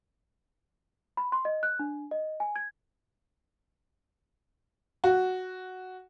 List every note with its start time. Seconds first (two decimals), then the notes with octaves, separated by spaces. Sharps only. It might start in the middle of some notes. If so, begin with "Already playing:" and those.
1.17 B5
1.32 C6
1.45 D#5
1.63 F#6
1.79 D4
2.11 D#5
2.40 G#5
2.56 G#6
5.04 F#4